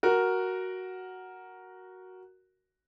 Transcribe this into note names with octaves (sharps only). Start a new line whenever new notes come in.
F#4 A#4